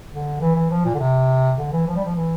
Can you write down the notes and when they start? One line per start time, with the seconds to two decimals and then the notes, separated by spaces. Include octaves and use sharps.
0.11 D3
0.41 E3
0.55 E3
0.70 F3
0.85 A#2
0.94 D3
0.99 C3
1.58 D3
1.72 E3
1.87 F3
1.96 G3
2.05 F3
2.16 E3